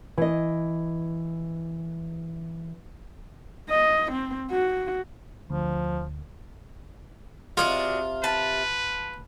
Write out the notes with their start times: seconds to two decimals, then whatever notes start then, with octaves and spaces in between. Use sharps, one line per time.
0.17 E3 D#5
3.70 D#5
4.12 C4
4.51 F#4
5.50 D2 F3
7.57 C3 G#3 D4 F4 F#4
8.24 B4 A5